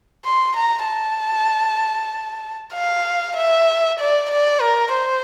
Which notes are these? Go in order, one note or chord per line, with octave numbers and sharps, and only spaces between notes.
C6
A#5
A5
F5
E5
D5
D5
A#4
C5